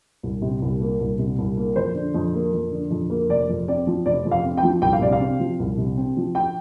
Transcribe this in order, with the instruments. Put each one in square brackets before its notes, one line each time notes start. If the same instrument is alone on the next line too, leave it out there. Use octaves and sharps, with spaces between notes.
[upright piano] C2
C3
C2
A#3
C2
C3
C2
A#3
F2 C5
D3
F2
A#3
F2
D3
F2
A#3
F1 D5
F2
C4 D5
F3
F1 D5
F2
F5
C4
G5
F3
C2 G5
F5
C3 D5
F5
C4
F3
C2
C3
C4
F3
G5